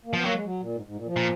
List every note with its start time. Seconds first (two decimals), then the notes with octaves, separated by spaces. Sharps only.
0.05 A#3
0.13 F3 B3
0.23 F#3 A#3
0.34 G#3
0.45 F#3
0.60 A#2
0.75 G#2
0.86 G#2
0.96 A#2
1.07 F3
1.16 A#2